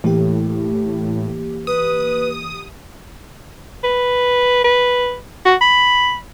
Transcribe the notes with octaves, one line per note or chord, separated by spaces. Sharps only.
A2 E3 A#3 G4
B4 D#6
B4
B4
F#4
B5